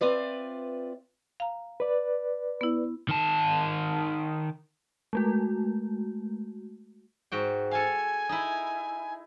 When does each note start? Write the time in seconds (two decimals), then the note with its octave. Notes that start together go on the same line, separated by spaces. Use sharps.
0.01 C4 F4 B4 D5 E5
1.40 F5 A#5
1.80 B4 D5
2.61 B3 E4
3.09 D#3 A5
5.13 G#3 A3 F#4
7.32 G#2 F#4 G5
7.71 A4 F5 G#5
8.29 D#4 E4